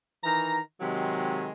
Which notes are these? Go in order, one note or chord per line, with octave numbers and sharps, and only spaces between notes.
D#3 E3 A#5
C3 D#3 F#3 G#3